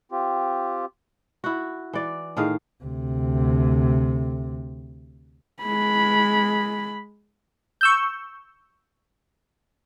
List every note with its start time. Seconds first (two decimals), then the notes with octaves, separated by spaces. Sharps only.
0.12 C4 F4 G4
1.44 E4 F#4
1.93 E3 D5
2.37 A2 D#3 G#4 F5
2.84 D2 C3
5.63 G#3 B5
7.81 C#6 E6 G6